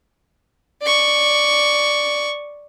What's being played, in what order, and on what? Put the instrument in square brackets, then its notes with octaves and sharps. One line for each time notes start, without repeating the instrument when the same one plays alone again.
[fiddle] D5 C#6